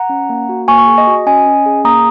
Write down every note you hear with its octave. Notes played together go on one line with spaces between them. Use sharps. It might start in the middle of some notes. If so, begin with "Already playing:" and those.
Already playing: F#5 A#5
C#4
A#3
F#4
A#3 G#5 C#6
G#5 C#6
G#4
D#5
F#4
C#4 D#5 G#5
C#4
G#4
A#3 A#5 D#6